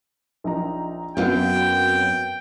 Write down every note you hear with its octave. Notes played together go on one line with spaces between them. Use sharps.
A#1 D#4 A#5
F#2 F#3 B3 C4 F5 G5